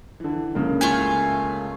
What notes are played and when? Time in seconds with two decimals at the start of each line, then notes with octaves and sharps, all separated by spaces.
0.20 D3 E3
0.55 C#2 C#3 A#3
0.81 A3 F4 G#5